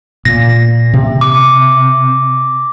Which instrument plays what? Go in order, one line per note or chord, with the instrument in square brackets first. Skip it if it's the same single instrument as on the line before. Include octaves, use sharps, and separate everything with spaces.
[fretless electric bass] A#2 A#3 [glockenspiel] A#6
[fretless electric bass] C3
[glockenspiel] D6